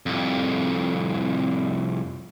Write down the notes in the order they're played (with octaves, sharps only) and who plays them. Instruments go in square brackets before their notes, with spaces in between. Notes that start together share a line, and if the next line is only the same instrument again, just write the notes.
[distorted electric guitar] C2 F2